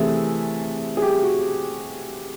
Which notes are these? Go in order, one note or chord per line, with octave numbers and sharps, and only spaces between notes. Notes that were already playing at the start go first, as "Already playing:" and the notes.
Already playing: C3 E3 A3 E4 G#4
G#4
G4
F#4